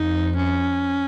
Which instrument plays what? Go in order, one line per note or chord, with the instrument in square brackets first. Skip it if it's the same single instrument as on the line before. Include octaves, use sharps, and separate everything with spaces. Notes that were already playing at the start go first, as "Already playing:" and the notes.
Already playing: [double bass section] F2 [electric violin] D#4
[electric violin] C#4